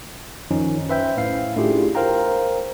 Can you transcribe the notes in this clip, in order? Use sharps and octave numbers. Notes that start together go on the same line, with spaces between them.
F#2 D#3 F3 C#4 D#4
B4 C5 E5 G5 B5 G6
A2 C#4 F5 C7
A3 D4 E4 F4 G4 G#4
A#4 C5 F5 G5 A#5